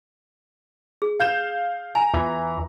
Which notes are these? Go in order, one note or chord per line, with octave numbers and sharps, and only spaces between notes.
G#4
F5 G6 E7
G#5 A#5
E2 E3 F4